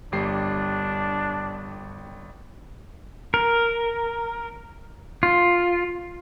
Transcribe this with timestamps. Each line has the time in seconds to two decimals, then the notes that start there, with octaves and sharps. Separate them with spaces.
0.12 G1 G3 D4 C7
3.34 A#4
5.23 F4